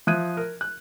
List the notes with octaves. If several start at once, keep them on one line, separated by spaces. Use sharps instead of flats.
F3 E5 D#6 F#6 G#6 D#7
A#4
F#6